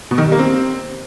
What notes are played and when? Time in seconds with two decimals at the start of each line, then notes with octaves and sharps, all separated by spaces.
0.11 B2
0.18 D#3
0.25 G3
0.32 A#3
0.39 C4